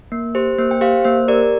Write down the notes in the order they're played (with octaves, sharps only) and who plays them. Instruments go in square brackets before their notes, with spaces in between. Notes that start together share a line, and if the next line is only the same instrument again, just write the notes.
[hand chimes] A#3
G4 C5
A#3 C5
G5
G4 C5 F5
A#3 C5
G4 A#4 D5